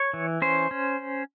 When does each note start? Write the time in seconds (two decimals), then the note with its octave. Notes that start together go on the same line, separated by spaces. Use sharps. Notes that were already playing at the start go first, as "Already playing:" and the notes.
Already playing: C#5
0.14 E3
0.42 C#4 C5
0.71 C#4